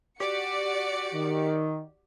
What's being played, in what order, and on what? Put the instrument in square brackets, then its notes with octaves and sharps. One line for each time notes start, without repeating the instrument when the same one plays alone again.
[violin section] F#4 D5 C#7 [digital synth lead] G4
[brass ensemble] D#3